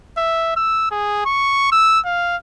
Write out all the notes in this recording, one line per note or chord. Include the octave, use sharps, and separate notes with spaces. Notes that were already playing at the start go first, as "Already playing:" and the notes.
E5
E6
G#4
C#6
E6
F5